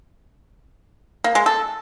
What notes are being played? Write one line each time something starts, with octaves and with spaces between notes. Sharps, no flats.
A#3
G#3
A4